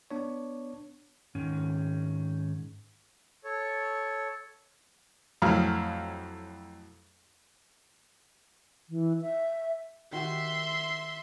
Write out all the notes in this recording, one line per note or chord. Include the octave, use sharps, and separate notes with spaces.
B3 D4 C#5
G#2 D#3 C#4
A4 C#5
F2 A2 F#3 F5
E3
E5
D#3 F#4 G4 E5 C6